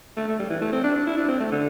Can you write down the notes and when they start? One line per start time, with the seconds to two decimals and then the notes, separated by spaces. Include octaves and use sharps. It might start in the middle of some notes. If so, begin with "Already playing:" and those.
0.17 A3
0.28 A3
0.39 G3
0.50 E3
0.62 A3
0.72 C4
0.84 D4
0.96 D4
1.07 E4
1.18 D4
1.29 C4
1.40 A3
1.52 D3